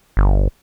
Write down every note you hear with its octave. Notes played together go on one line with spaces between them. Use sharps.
G1